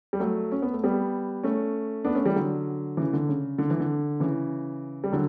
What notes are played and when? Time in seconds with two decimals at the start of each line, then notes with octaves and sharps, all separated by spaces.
0.13 G3
0.20 F#3 A3
0.52 C#4
0.62 B3
0.73 A3
0.83 G3 B3
1.43 A3 C#4
2.04 B3 D4
2.15 A3 C#4
2.25 E3 G3
2.36 D3 F#3
2.97 C#3 E3
3.13 D3
3.29 C#3
3.58 D3
3.70 E3
3.80 D3
4.20 C#3 E3
5.04 G3
5.12 D3 F#3